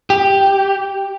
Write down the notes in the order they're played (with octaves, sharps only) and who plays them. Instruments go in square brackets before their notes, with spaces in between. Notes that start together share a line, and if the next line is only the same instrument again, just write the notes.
[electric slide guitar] G4